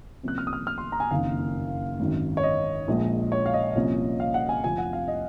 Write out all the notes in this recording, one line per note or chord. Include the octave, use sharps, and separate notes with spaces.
C2 C3 F3 A#3 C#4 F#6
F6
D#6
F6
F6
C6
A#5
G#5
F#1 F2 D#3 A#3 F5
G#1 F#2 D#3
C#5
D#5
A#1 A#2 F3 G#3
C#5
F5
D#5
C2 A#2 F3 A#3 C#4
F5
F#5
G#5
F1 F2 C3 F3 G#5
F#5
F5
D#5